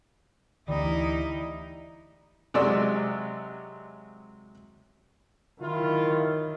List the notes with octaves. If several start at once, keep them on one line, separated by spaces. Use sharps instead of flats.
D2 E3 G3 D#4 E4
C3 F#3 G#3 D5 C6 E6
D#3 F#3 E4 F4